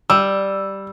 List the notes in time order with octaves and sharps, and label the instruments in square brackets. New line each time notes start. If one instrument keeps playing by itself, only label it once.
[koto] G3 [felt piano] E6